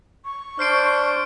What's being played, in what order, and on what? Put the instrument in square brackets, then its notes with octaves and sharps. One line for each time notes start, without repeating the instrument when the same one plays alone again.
[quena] C#6
[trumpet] D4 [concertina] C5 [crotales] F6 C7 D7